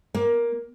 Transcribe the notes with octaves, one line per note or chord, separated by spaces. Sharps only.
A#3